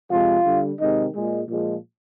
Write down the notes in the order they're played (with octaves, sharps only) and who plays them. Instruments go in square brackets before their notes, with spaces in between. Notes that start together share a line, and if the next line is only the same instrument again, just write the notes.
[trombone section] C3 F3 G#3 F4
D3 G3
C3 D#3 G#3 D#4
A#2 G#3
A#2 F3 G#3